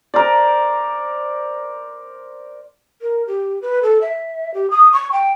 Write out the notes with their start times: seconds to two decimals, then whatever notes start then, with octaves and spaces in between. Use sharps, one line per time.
0.14 A#4 C5 D5
3.01 A#4
3.27 G4
3.62 B4
3.83 A4
4.01 E5
4.54 G4
4.70 D#6
4.93 C#6
5.12 G5